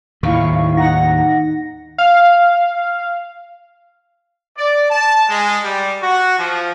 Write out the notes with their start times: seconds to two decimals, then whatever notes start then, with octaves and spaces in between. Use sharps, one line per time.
0.23 D#2 A2 D#3 E4 F5 C#6
0.77 D#4 F#5 A#6
1.98 F5
4.57 D5
4.90 A5
5.28 G#3
5.63 G3
6.01 F#4
6.38 F3